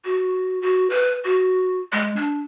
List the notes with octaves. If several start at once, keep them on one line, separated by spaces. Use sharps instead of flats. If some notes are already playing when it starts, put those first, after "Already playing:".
F#4
F#4
B4
F#4
G#3
D4